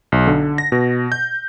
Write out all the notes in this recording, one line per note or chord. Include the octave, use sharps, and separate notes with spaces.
B1
D3
A#6
B2
G6